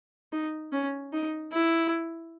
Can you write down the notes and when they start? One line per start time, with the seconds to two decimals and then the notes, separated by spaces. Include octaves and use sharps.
0.32 D#4
0.73 C#4
1.13 D#4
1.53 E4